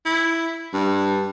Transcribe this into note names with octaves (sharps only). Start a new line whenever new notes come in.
E4
G2